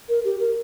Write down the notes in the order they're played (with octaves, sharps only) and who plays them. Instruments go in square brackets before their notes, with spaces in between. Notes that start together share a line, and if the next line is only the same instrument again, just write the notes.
[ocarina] A#4
G4
A#4